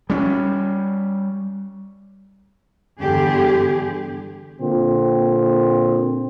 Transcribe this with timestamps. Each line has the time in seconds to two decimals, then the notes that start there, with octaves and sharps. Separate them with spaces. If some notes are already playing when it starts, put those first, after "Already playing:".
0.10 G3 C#4
3.00 E2 G2 D3 G4 G#4
4.61 A#2 D3 C4